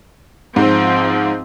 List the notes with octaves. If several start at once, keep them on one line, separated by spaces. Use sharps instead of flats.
G#2 F3 C4